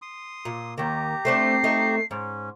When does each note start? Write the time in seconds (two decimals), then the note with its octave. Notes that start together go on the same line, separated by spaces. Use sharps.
0.02 C6 D#6
0.45 A#2
0.78 D#2 D#3 G4 A#5
1.25 A3 C4 D4 C7
1.64 A3 D#4
2.11 G#2 C#4